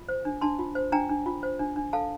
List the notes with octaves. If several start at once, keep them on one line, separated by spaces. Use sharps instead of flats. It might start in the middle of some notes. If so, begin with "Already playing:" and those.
Already playing: F4
C5
D4
D4 A5 C6
F4
C5
D4 G5 A#5
D4
F4
C5
D4
D4
A4 F5 A5